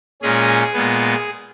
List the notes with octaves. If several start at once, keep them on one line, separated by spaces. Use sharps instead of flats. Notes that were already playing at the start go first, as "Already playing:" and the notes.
A#2 G#3 C#4 G#4
A#2 G#3 B3